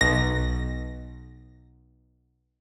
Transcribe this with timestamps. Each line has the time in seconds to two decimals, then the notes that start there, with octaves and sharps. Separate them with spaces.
0.01 B1 A#6